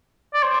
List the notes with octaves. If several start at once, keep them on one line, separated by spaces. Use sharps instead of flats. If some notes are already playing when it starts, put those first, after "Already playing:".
D5
C5